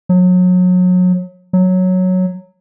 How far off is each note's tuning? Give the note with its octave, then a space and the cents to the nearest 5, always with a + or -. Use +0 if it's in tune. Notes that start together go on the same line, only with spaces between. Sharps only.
F#3 -30
F#3 -5